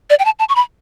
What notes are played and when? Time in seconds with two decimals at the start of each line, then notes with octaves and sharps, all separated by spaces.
0.10 D5
0.19 G5
0.25 A5
0.39 A5
0.49 C#6
0.56 B5